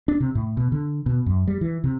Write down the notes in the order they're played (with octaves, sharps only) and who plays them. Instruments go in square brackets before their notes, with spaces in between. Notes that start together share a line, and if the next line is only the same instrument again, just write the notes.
[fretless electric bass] D4
C3
A2
B2
D3
B2
F#2
G3
E3
C3